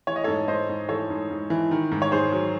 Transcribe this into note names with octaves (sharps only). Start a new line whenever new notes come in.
E3 C#5
D#5
A4 C#5
G#2
G#2 C5 D#5
G#2
E3 A4 C#5
G#2
G#2
E3
D#3
G#2
C#5
G#2 G#4 C5
F#3